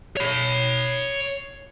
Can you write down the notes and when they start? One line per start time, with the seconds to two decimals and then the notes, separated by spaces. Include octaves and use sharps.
0.17 C#5 B5